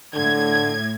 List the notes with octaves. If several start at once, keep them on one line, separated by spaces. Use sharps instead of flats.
A2 D3 G#6